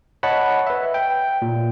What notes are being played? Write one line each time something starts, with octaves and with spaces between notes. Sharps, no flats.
C#5 D#5 F#5 A5 B5
B4 E5
G5
A#2